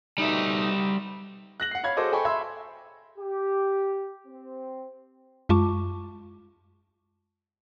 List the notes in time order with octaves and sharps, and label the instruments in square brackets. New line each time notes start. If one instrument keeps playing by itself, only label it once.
[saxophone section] B2 A3 D#4 [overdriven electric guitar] G3 E5
[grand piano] F#6 A#6 F#7
F#5 C7
C#5 F5 B5 G#6
F#4 G#4 A4 C5 D#5 D6
A4 D#5 G5 G#5 B5 C#6
E5 B5 C6 E6 G#6
[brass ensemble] G4
C4
[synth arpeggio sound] F#2 G#3 F4 A5 C#6 D6